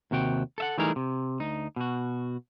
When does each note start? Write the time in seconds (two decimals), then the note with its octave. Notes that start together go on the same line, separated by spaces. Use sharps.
0.11 D#2 C3 F#4 G5
0.58 A4 E5 F#5
0.78 E3 G3 A3 D#4 G#4 A#4
0.96 C3
1.40 D2 D#4
1.76 B2 F#4